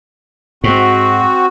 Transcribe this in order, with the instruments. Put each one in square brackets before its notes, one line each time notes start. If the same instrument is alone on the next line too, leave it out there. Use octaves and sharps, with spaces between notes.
[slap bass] G#2 [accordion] C4 F#4